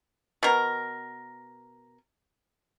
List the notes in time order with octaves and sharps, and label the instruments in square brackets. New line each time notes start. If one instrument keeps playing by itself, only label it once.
[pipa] B2 A#4